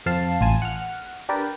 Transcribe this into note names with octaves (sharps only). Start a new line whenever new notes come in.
F2 C4 F5 A5 C7
A1 F4 G#5 A5
F#5 F6
D4 G4 A#4 B4 D5